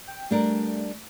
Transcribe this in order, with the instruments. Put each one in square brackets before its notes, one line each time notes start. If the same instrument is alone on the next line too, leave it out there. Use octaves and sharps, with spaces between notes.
[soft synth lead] G5
[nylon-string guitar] G3 D4 A#4 [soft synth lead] A3